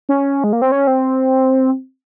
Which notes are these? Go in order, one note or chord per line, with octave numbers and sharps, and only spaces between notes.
C#4
G#3
A#3
C4
C#4
C4